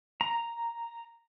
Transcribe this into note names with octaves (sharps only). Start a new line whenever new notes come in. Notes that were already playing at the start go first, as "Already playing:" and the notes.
A#5